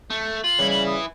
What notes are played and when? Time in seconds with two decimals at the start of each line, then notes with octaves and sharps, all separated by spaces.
0.10 A3
0.44 F4 F#7
0.59 C#3 E3 G3 E4
0.71 F#7
0.87 D#6